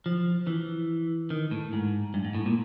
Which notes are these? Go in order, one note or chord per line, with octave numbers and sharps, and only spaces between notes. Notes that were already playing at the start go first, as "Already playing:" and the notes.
F3
E3
D#3
A2
G#2
G2
G#2
A2
A#2